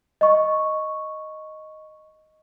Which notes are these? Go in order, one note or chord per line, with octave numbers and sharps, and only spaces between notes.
D#5 C#6